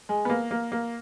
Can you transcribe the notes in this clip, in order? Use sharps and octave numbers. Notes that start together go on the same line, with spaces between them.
G#3
B3
A#3
A#3
A#3